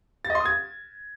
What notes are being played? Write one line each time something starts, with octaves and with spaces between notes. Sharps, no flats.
A6
D#5
C6
D#6
G#6